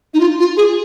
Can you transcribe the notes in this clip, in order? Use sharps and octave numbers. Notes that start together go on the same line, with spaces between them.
D#4
F4
F4
G#4